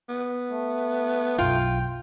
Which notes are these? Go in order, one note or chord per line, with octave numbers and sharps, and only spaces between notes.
B3
A3
B1 F#2 F4 G5